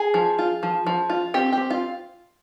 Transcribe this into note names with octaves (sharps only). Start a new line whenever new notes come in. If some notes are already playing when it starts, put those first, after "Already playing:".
Already playing: G#4
F3
F4
F3
F3
F4
C4 G4
C4 G4
F4